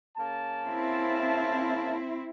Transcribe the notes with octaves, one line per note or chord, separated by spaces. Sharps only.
C#3 A#3 A5
C4 E4